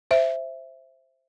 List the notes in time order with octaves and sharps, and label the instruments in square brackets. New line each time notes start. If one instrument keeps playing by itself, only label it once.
[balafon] C5 E5